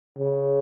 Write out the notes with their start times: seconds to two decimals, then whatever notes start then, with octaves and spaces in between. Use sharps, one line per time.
0.18 C#3